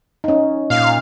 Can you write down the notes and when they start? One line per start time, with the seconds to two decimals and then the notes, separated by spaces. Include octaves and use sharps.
0.24 C#4 D#4
0.70 A#2 F5